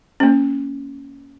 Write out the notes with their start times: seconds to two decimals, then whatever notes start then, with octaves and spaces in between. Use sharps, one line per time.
0.20 A#3 C#4